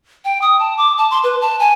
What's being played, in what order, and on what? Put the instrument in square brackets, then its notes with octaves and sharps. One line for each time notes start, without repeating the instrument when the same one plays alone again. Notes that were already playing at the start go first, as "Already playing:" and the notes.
[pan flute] G5
D#6
A5
D6
A5
C6
B4
A5
G#5